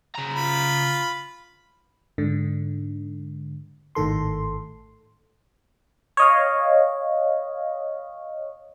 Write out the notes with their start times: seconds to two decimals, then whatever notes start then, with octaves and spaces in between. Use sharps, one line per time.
0.15 C#3 A#5
0.34 F4 B5
2.18 G#2 D3
3.95 G#1 A2 D#3 A4 C6
6.17 C#5 D#5 F5